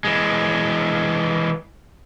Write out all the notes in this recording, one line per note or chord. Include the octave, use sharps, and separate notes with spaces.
E3 G#3